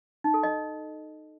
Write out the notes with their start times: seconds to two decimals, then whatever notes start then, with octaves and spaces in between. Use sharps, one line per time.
0.24 D#4
0.34 A4
0.43 D#5